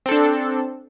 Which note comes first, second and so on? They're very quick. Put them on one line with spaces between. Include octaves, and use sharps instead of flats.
C4 A4 D4